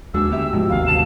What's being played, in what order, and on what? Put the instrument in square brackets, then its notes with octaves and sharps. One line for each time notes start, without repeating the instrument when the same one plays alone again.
[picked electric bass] D#2 G#3 [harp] D4 F#4 G#5 [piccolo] E6
[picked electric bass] D2 [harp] B3 G4 E5
[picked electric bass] G#2 F3
[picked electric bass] G#1 D#2 C3 [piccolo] F5
[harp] D2 B2 A5 [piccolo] E7